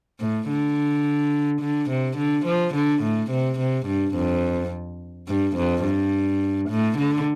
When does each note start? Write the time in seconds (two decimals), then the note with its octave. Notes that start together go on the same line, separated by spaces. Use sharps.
0.20 A2
0.48 D3
1.61 D3
1.90 C3
2.17 D3
2.46 F3
2.75 D3
3.03 A2
3.31 C3
3.59 C3
3.86 G2
4.15 F2
5.28 G2
5.56 F2
5.84 G2
6.70 A2
6.98 D3